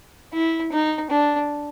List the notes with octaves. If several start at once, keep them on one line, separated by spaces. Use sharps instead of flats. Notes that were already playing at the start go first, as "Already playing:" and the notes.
E4
D#4
D4